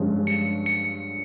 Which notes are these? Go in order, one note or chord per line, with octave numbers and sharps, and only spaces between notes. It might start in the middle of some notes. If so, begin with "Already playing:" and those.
Already playing: G2 D3 F3 G#3 C#4
C#7
C#7